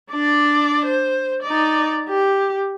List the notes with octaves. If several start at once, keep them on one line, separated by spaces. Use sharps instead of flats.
D4 D5
C5
D#4 D5
G4